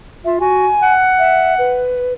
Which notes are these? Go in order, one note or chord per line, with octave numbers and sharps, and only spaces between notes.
F4 E5
F#4 G#5
F#5
E5
B4